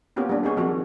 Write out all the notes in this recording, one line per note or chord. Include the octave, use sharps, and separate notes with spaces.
A#3 B3 C#4 F4 G4
G3 A#3 D4
B3 D#4 G#4 C#5
D#3 F3 C4 F#4